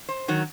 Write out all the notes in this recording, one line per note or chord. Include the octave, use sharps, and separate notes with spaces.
C5
D#3 F#3